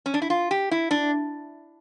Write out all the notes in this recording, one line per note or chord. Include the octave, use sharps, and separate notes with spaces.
C#4
D4
E4
F4
G4
E4
D4